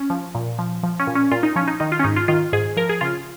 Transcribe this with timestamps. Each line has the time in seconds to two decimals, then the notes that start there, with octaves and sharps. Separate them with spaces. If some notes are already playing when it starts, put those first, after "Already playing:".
Already playing: C#4
0.10 F3
0.35 A#2
0.59 F3
0.83 F3
0.99 C#4
1.07 A#2
1.15 C#4
1.31 A#2 F4
1.43 D#4
1.56 F3 C#4
1.68 D#4
1.80 D#3 D#4
1.92 F4
1.99 C#4
2.04 G#2 D#4
2.16 F4
2.28 D#3 F4
2.53 G#2 G#4
2.77 F3 A#4
2.89 G#4
3.01 C#3 F4